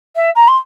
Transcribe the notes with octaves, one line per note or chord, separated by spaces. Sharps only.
E5
A#5
C6